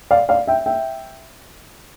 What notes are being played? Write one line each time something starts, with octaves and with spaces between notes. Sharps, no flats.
D5 F5
D5 F5
E5 G5
E5 G5